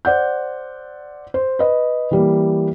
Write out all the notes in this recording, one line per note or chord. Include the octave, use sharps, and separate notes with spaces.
C5 D5 F#5 G6
C5
B4 D#5
E3 G3 A#3